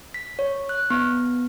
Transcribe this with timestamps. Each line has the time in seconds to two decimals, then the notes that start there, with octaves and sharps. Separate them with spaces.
0.14 B6
0.39 C#5
0.69 F#6
0.90 B3